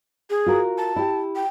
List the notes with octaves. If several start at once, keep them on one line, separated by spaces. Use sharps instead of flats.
G#4
F4 F#4 A#4
A5
E4 G4
G5